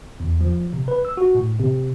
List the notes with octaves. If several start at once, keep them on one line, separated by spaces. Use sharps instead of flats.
E2
F3
C3
B4
E6
F#4
A2
C3